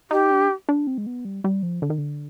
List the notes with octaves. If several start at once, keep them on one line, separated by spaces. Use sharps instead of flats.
D#4 G4
D4
D4
C4
G#3
B3
G3
G3
F3
D3
D#3
D3